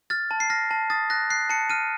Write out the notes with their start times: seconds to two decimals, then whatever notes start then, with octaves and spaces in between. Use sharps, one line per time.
0.10 F6 A6
0.31 A5
0.40 C7
0.50 F6 A#6
0.71 A5
0.90 D#6 A6
1.10 F#6 A#6
1.30 F#6 C7
1.50 A5 C#7
1.70 F6 D#7